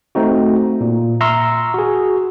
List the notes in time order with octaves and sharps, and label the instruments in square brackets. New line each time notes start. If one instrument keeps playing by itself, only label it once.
[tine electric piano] A3 C4 D#4 F#4
A#2
E5 A#5 C6 C#6 E6 F6
F#4 G#4